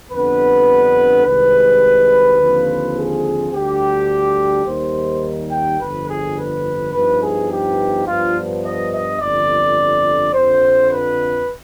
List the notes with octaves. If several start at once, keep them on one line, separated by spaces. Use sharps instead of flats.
F2 D3 G3 B3 D4 B4
C2 C3 D#3 G#3 B4
D#2 D3 F3 C4 F4
G#4
D2 D3 G3 D4 G4
D#2 D#3 G3 C5
G5
G1 F2 D3 B4
G#4
B4
G2 F3 B3 D#4 B4
G#4
G4
G2 F3 B3 D4 F4
D#5
D#5
G1 F2 D3 D5
F2 D3 F3 C5
B4